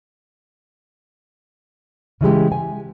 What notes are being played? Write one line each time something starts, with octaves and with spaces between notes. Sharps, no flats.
C#3 E3 G#3 G4
G#5